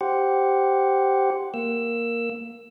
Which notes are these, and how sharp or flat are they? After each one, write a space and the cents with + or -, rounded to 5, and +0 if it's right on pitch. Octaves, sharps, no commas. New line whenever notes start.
G4 -10 C5 +0 F#5 +0
A#3 +0 E6 +10